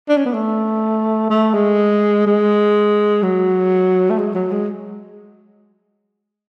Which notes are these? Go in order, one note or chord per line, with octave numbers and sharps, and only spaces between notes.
D4
C#4
B3
A3
A3
G#3
G#3
F#3
A3
G#3
F#3
G#3